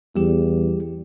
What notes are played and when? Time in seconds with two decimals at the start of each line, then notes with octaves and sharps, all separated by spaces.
0.16 E2 G3 G4